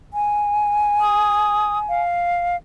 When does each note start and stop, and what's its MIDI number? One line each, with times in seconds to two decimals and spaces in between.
0.14 2.01 80
1.01 1.78 87
1.89 2.56 77